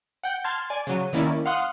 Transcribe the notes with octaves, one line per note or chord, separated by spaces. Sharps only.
F#5 G5 G6
A5 C6 F6 G#6 A6
D5 G#5
C#3 F#3 D#7
D#3 A#3 C#4 E4 D5
F5 F#5 C6 D#6 F6 F#6